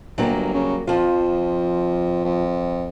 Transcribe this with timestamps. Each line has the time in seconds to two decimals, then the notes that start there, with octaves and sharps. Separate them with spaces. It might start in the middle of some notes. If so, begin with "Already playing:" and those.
0.18 G1 F#3 G3 A#3
0.53 C#3
0.87 F2 F3 F4
2.24 F2